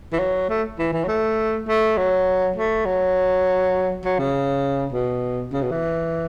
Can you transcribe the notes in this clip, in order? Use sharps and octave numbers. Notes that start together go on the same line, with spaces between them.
E3
F#3
A3
E3
E3
F#3
A3
A3
F#3
A3
F#3
F#3
C#3
B2
C#3
B2
E3